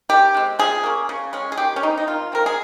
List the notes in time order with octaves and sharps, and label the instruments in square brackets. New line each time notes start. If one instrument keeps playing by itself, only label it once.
[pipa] D#3 G4
G#3 C4
F3 G#4
A#3 C#4
C#3
G#3 C#4
G#4
D#3 G4
C#4
G3 C4 D#4
D#4
D#3 F4
G#3 C4 A#4
G#4